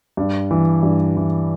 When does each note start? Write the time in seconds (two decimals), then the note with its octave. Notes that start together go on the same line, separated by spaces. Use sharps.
0.17 G2
0.51 E3
0.83 G2
1.17 E3